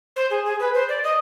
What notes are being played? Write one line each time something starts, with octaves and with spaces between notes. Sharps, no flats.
C5
G#4
G#4
B4
C5
D5
D#5